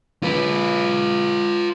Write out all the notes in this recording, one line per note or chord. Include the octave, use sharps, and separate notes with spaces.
F4 B4